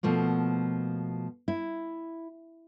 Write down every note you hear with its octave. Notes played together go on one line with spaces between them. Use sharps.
B2 F3 A3 A#3
E4